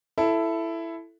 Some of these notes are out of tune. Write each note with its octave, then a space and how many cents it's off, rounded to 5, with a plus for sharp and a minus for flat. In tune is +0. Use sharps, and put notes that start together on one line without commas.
E4 +10 A4 +0